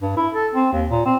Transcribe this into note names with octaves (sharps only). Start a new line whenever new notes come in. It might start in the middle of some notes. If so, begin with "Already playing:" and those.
G2
E4
A4
C4
D#2
A#2
C4